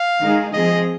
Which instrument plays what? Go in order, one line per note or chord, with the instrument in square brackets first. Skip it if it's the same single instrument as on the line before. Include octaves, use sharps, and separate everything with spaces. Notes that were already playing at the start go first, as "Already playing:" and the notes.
Already playing: [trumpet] F5
[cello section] D#3 G#3 D#4 G#4
[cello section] F3 C4 G#4 [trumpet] D#5